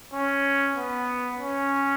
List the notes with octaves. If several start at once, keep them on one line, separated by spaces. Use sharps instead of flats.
C#4
B3
C#4